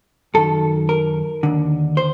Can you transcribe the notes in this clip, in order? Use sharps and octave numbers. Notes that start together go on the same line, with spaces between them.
F#2 D#3 A4
A#4
D#2 D3
C5